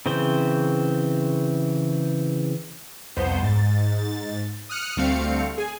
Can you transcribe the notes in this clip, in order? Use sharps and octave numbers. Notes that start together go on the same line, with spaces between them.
C#3 E3 C4 C5
C2 F2 B3 C5 G6
G#2 A6
D#6 F6 F#6 C#7
D2 G3 A3 C4 F5 C#7
G#4 G#5